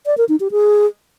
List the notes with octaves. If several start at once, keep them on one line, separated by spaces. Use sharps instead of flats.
D5
A#4
D#4
G4
G#4